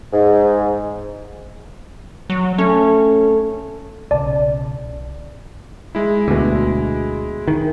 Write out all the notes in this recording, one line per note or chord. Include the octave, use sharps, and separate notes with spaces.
G#2
F#3
A3 C#4
B1 C#3 D5 A5
G#3 E4
D2 B2
D#3